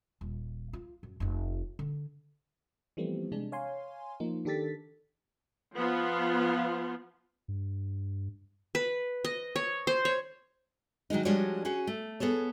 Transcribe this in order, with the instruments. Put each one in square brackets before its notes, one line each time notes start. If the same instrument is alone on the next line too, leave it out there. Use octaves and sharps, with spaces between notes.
[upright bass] D#1
F4
F#2
F1 D#4
D3
[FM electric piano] E3 F3 G3 A3 B3 C4
C3 G#3 D4
C#5 F5 G#5 C6
F3 A#3 D#4
D#3 D4 G4 A4 A6 B6
[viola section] F3 B3 F4
[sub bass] G2
[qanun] B4
D#5
C#5
C5
C#5
[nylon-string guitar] D#3 F#3 G#3 D#4
F3 G3 G#3 D4 F#4 C#5
C#4 F#4 G#4
A3
B3 G#4 A4 C#5